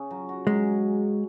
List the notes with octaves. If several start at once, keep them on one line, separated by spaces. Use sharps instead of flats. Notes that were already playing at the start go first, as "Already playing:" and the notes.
Already playing: C#3 C#4
F#3
F#4
F#3 G#3